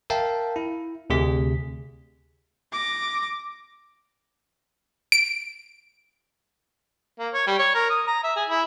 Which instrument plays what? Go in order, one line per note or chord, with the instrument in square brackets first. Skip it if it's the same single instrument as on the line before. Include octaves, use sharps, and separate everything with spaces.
[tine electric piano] A#4 E5 F5 G5 A5
E4
D2 C3 G#4 B6
[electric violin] D6 A#6
[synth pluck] D7
[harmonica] A#3
C#5
G3
C#5
A#4
D#6
A#5
E5
G#4
E4